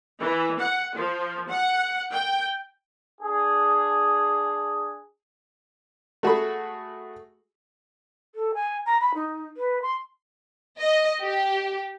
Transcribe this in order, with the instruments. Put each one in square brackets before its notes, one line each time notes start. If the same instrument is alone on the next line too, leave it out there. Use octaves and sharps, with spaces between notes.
[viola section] E3
F#5
F3
F#5
G5
[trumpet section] D4 G#4
[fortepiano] A3 F#4 G#4 B5
[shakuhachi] A4
G#5
A#5
B5
D#4
B4
C6
[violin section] D#5
G4